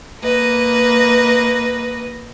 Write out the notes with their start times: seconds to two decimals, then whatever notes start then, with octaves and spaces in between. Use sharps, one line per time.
0.21 A#3 B4 D#5